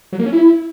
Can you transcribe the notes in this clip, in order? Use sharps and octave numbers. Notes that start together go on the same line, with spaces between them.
F#3
A#3
C#4
E4